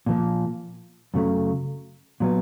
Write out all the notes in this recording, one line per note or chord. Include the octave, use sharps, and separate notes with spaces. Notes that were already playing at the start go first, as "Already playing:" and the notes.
A#2 F3 A#3
F#2 C#3 F#3 A3
A#2 F#3 B3